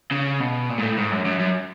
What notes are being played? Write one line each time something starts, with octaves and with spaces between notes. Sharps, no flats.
C#3
B2
A#2
G#2
A2
G#2
F#2
F#2
F#2